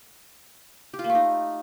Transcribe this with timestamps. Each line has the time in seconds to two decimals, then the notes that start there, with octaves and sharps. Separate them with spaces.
0.94 G4
0.99 F4
1.04 A#3
1.10 A3
1.15 D#4